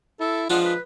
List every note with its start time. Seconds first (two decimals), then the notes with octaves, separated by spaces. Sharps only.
0.20 E4 A4
0.50 F3 G#3 D4 F4 F#5
0.64 B4